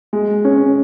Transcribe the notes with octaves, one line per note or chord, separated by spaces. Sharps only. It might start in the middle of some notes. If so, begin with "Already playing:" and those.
G#3
C#4